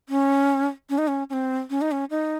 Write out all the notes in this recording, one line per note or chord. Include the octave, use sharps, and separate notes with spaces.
C#4
C#4
D#4
C#4
C#4
C4
C#4
D#4
C#4
D#4